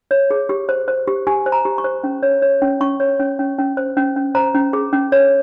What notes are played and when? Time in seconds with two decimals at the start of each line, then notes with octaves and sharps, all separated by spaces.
0.11 C#5
0.31 G#4
0.49 G4
0.69 C5
0.88 C5
1.07 G4
1.27 G4 G#5
1.46 C5
1.52 A#5
1.65 G4
1.78 C#6
1.84 C5
2.04 C#4
2.23 C#5
2.42 C#5
2.62 C#4
2.81 C#4 C#6
3.00 C#5
3.19 C#4
3.39 C#4
3.58 C#4
3.77 C5
3.97 C#4
4.16 C#4
4.35 C5 A#5
4.55 C#4
4.73 G#4
4.93 C#4
5.12 C#5